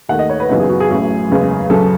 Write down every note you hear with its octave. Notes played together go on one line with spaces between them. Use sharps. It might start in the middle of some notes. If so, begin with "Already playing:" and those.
D#2 D#3 A3 F#5
D#5
C#5
B4
F#2 C#3 E3 B3 D#4
G#4
F#4
G#4
A1 A2 F#3 C#4
F#1 E2 C#3 G#3
F#2 C#3 F#3 A4